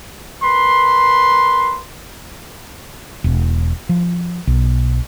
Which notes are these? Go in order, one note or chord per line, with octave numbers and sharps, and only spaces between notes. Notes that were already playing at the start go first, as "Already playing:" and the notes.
A#4 B4 C6
E1
F3
B1